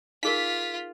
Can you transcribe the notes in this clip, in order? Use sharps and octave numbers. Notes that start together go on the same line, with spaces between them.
D#4 F4 G#4 A#4 B6